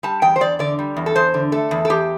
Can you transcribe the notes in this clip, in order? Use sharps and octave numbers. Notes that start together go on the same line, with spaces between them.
G3 A5
E2 G5
C5
E2 D5
D3 D5
G3
E2
A4
E2 C5
D3
A3 A4
E2
A4
E2 G4